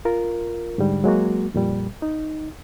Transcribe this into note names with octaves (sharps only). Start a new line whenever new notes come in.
F4 A#4
G#2 D3 G3
F#3 G#3 A#3 F#4
F2 A#2 G3
D#4